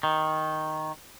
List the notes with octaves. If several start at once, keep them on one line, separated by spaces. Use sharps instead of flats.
D#3